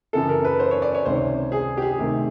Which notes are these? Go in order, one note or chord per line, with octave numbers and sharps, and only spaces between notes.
F#2 C#3 E3 A4
A#4
B4
C5
C#5
D5
C#5
C#2 C3 D#3 C5
G#4
G4
G#4
D2 C3 D#3